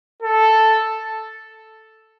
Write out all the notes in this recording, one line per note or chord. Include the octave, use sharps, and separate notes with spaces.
A4